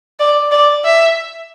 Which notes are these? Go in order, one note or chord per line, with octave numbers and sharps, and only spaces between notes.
D5
D5
E5